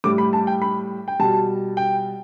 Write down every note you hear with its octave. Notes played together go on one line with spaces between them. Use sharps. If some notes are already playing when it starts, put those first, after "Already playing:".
A2 G3 D6
B5
A5
G5
B5
G5
B2 G3 A5
G5